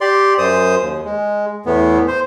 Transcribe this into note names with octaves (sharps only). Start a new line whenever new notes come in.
G4 D5 C6
F#2 C5 D#6
D#2
G#3
E2 A2 B3
C5